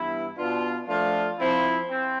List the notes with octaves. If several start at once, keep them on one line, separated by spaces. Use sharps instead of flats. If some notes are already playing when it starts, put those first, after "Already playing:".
Already playing: G2 E3 B3 E4
B2 B3 D4 F4
F3 A3 D4 F4
F3 C4 E4
C4